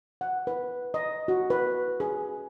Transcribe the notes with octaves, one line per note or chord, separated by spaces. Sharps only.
F#5
B4
D#5
F#4
B4
G#4